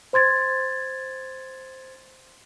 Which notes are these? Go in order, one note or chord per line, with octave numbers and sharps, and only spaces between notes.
C5 C6 G#6 A6